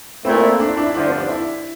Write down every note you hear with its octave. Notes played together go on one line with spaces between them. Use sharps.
A#2 A3 C4 E4
D4
E4
D4
E4
G2 D3 F3 D4
C4
D4
E4